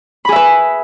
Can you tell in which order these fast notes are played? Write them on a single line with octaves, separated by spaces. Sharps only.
B5 G#4 E5 B4